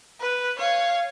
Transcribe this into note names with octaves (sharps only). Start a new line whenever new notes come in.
B4
C#5 F5